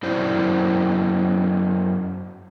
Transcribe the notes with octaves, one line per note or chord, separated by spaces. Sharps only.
F#2 E4 C5 D5